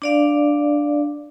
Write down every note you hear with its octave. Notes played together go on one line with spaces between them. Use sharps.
D4 D5 F5